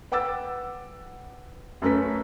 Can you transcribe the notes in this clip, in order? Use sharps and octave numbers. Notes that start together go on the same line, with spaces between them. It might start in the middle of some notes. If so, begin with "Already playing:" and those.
B4 F#5 G5 D6 E6 A6
F#2 A3 C#4 B4 B6